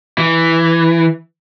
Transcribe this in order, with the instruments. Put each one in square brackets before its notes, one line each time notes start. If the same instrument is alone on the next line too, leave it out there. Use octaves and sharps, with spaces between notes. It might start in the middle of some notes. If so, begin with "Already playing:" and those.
[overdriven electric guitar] E3